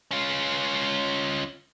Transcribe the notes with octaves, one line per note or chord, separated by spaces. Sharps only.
C#4 F4